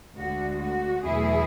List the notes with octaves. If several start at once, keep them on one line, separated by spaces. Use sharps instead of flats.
D2 D3 G#3 F#4
F#4
E2 B2 F#3 A3 E4 G#4